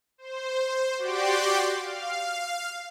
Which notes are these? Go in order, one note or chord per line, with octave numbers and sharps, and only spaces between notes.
C5
F#4 G4 D5 G5 C6 D6
F5